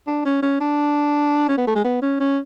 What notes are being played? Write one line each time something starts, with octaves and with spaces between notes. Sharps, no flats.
D4
C#4
C#4
D4
C#4
B3
A3
G#3
B3
C#4
C#4